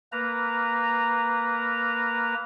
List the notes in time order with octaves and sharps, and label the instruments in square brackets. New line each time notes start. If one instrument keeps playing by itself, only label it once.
[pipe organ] A#3 B4 A#5